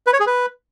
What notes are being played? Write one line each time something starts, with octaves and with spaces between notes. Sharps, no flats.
B4
C#5
G#4
B4